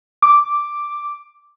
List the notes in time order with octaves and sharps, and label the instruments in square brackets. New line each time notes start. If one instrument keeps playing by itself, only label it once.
[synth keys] D6